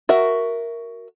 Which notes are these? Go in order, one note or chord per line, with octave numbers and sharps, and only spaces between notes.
F#4 A#4 E5